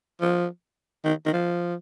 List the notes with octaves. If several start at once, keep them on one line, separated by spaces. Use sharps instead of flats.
F3
D#3
D#3
F3